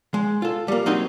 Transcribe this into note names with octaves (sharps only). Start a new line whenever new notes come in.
G#3
F4 A4
G3 A#3
F#3 C4 D#4 G4 D#5